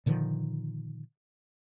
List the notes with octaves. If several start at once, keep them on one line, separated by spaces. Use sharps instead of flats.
A#2 D3 D#3 F3